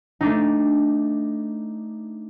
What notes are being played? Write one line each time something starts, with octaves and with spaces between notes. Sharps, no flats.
A3 D4 D#4